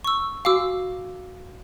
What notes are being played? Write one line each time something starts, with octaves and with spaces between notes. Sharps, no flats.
C#6 E6
F#4 F5 G#5 D6 E6